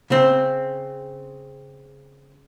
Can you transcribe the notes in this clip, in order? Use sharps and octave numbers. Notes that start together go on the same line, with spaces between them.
C#3 C4